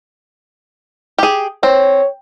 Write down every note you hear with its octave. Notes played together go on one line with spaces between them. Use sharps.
G4 G#4
C4 C#5